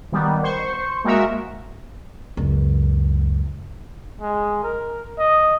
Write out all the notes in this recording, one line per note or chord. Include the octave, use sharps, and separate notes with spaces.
D#3 G3 B3
C5 C#6
G#3 A#3 F#4 A#4 E5
C#2 F#2
G#3
A#4
D#5